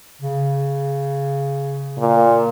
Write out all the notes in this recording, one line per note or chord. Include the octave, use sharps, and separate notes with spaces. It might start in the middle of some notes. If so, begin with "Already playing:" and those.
C#3
A#2